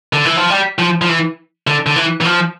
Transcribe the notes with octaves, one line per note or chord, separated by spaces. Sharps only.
D3
E3
F3
G3
F3
F3
E3
D3
D3
E3
E3
F3